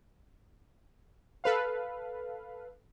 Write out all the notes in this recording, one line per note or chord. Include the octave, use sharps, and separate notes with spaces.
A4 B4 F5